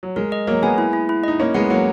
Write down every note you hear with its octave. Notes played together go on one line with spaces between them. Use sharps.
F#3
G#3 A#4
D#5
F#3 A#3 A#4
G#3 B3 G#5
E4
E4
E4
D#4 D#5
A#3 C#4 E4
G#3 B3 F#5
F#3 A#3 F#5